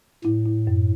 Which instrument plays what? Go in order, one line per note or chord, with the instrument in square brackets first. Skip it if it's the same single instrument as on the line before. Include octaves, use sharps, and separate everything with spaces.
[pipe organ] A2 [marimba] E4
[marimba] E4
F#2